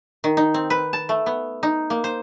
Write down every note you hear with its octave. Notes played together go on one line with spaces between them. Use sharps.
D#3
D#4
C4
B4
A5
A3
B3
D#4
A#3
C5